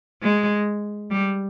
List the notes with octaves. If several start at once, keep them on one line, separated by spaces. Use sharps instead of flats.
G#3
G3